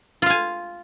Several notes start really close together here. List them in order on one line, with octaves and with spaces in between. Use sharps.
F4 F5 G#5